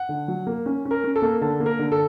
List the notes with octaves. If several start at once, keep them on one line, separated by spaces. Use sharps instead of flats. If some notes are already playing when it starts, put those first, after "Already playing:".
Already playing: F#5
D3
F#3
A#3
C#4
C#4
A#4
C#4
A4
A#3
D3 A4
A#3
A#4
D3
A4